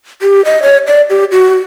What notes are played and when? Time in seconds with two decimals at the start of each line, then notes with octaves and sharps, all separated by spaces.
0.22 G4
0.45 D#5
0.62 C#5
0.87 D5
1.10 G4
1.32 F#4